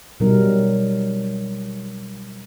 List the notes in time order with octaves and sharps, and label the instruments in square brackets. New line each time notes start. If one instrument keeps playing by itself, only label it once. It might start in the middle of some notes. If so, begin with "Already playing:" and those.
[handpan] B2 F#3 G3 D#4 A#4